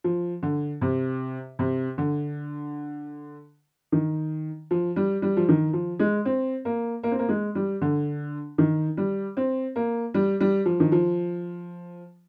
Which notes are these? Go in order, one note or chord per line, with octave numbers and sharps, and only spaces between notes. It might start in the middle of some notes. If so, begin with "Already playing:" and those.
F3
D3
C3
C3
D3
D#3
F3
G3
G3
F3
D#3
F3
G#3
C4
A#3
A#3
C4
A#3
G#3
G3
D3
D#3
G3
C4
A#3
G3
G3
F3
D#3
F3